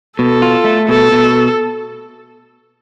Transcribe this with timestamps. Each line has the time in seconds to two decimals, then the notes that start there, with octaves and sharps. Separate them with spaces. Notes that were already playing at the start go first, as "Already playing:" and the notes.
0.18 B2 A4
0.42 F4
0.64 A3
0.88 B2 A4
1.12 B2